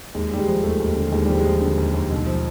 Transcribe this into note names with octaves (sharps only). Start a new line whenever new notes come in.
D#2 G#3
D#2 G3
G#3
F3
D#2 A3
D#2
D3
D#2 G#3
F3 G3
G#3
F3
D3
D#2
D#2
B1
F3